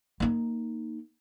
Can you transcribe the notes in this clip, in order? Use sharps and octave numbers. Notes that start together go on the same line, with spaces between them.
A#3 D#4